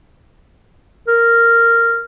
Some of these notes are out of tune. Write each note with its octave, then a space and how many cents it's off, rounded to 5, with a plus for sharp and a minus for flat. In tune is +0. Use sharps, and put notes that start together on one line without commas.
A#4 -10